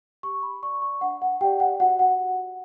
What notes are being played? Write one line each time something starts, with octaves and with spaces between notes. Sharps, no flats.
G4 C#6
B5
D5 C#6
C#6
D4 F#5
F#5
G4 D5 G5
F#5
F#4 F#5
F#5